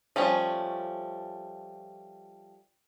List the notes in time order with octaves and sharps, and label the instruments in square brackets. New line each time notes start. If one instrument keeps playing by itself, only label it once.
[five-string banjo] F3 G3 A3 C#4